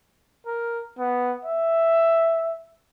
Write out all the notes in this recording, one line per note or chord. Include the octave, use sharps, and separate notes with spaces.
A#4
B3
E5